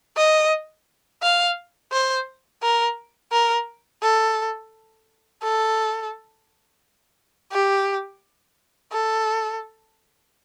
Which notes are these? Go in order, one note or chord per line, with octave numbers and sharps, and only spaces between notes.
D#5
F5
C5
A#4
A#4
A4
A4
G4
A4